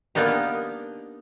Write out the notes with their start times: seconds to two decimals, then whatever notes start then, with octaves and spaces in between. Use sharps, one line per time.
0.15 A#3 B3 D4 D#4 G4